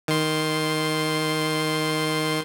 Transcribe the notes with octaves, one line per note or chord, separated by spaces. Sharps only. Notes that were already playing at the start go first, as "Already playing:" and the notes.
D#3 C6